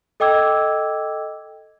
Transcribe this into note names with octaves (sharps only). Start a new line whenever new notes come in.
A4 D#5 G5 D6 E6 G#6